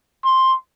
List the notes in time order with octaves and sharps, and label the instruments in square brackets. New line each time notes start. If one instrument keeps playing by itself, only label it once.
[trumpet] C6